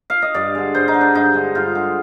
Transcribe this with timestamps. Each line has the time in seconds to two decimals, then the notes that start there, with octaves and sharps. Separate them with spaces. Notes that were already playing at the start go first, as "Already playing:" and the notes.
0.10 F5
0.22 D#5
0.34 G2 D5
0.55 D3 G#3
0.75 G2 C5
0.88 D#4
0.94 D3 G#3
1.01 D4
1.15 G2 D#4
1.34 D3 G#3
1.55 G2 F4
1.75 D3 G#3